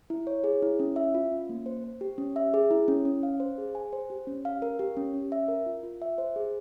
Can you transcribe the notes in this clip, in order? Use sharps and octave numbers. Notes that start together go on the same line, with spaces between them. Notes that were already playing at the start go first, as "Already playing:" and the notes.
E4
C#5
G#4
E4
C#4
E5
F4
C#4
A#3
C5
C5
G4
C#4
E5
G#4
E4
C#4
C#4
F5
C5
G#4
G#5
C5
G4
C#4
F5
A#4
G4
C#4
C#4
E5
A#4
F4
F4
E5
C5
G#4